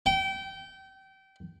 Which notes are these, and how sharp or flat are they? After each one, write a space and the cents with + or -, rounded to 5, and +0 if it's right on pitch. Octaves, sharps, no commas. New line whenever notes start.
G5 -25